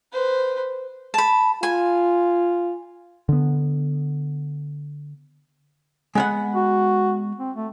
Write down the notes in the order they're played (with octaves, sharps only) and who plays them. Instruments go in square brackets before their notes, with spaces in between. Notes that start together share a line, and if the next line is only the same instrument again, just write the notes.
[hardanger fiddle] B4 C5
[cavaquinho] A5 B5
[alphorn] F4 [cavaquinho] G#5
[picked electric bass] D3 B3
[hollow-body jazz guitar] G#3 B3 F#5
[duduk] F#4
C4
A3